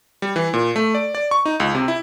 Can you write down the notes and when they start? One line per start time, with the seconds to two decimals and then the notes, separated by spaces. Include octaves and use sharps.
0.22 G3
0.36 E3
0.54 A#2
0.76 A3
0.95 D5
1.15 D5
1.31 C#6
1.46 D#4
1.60 C#2
1.75 C3
1.88 E4